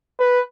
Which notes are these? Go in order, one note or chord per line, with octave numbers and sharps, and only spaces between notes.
B4